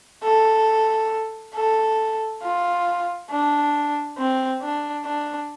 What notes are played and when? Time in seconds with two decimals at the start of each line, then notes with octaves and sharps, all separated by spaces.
0.23 A4
1.55 A4
2.42 F4
3.30 D4
4.18 C4
4.62 D4
5.05 D4